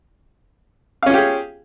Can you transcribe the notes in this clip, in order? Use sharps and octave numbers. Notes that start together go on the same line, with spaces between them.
C#4 F4 G4 G#4 F5